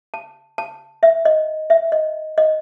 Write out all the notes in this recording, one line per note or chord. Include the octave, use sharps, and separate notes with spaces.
A5
A5
E5
D#5
E5
D#5
D#5